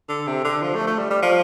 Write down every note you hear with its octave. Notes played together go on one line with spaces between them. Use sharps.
D3
C3
D3
F3
A3
A3
G3
G3
F3